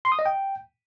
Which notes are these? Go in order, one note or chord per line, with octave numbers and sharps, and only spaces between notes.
C6
D#6
D#5
G5